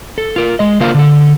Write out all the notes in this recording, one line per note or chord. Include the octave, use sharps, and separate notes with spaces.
A4
F4 A#4
G#3 D#5
C#3 A#3 F4 A#4 C5 F5
D3 A4